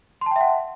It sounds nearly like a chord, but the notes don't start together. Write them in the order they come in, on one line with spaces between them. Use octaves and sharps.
C6 A5 G5 E5 F#5